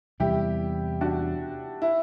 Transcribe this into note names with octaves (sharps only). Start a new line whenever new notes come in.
E2 C3 G3 E4 G4
D4 F#4
E4